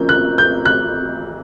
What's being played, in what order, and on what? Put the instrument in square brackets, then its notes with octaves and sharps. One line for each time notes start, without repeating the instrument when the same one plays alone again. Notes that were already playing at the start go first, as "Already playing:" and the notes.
Already playing: [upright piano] F3 A#3 C#4 G6
F#6
G6
F#6